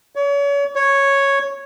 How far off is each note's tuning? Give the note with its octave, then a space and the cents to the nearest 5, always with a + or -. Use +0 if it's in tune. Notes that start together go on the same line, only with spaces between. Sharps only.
C#5 +35
C#5 -5